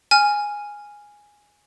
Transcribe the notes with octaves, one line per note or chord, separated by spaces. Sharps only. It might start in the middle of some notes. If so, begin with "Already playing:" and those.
G#5 F6